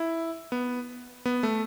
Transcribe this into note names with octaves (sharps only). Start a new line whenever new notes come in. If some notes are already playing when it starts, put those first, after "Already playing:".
Already playing: E4
B3
B3
A3